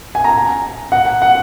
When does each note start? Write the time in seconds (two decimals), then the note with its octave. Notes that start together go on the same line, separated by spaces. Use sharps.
0.15 G#5
0.24 A#5
0.92 F#5
1.22 F#5